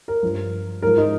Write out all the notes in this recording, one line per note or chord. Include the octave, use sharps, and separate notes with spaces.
A#4
G2 F3
G#2 F3 A#4
D#4